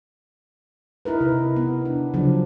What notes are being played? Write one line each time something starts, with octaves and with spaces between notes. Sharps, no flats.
D#4 E4 A#4 B4
C3
B3
D4
C#3 F3 F#3 D4